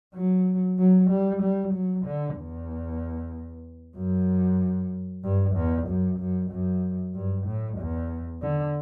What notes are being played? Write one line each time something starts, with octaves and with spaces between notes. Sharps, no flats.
F#3
F#3
G3
G3
F#3
D3
E2
F#2
G2
E2
F#2
F#2
F#2
G2
A2
E2
D3